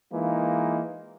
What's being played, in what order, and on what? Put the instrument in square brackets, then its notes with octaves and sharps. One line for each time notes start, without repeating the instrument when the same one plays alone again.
[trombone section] E3 G#3 A#3 D#4 F4